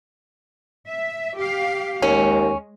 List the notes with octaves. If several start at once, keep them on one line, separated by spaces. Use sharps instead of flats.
E5
G4 F5
D#2 G#3 C#4